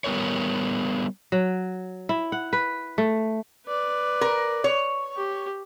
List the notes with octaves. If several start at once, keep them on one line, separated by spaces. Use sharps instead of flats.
G3 B3 A#4 C#5
F#3
E4
F#5
B4
A3
B4 D5
A#4
C#5
G4